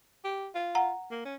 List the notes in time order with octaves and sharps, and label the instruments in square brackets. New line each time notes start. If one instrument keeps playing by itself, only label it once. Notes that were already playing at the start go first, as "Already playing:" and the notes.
[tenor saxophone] G4
F4
[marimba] F#5 A#5
[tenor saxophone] A#3
C#4